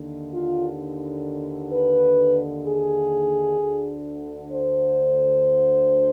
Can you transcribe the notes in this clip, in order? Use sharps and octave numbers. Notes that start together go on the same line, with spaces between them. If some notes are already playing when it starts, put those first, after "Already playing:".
Already playing: D#2 D3
F4
B4
G#4
D2 D3
C5